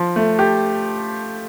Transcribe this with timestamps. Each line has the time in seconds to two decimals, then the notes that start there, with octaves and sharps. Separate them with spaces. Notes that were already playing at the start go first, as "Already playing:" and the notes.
Already playing: F3
0.16 A3
0.39 G4